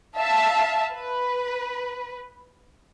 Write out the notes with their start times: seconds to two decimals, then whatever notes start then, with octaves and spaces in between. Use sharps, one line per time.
0.19 E5 F5 A5
0.94 B4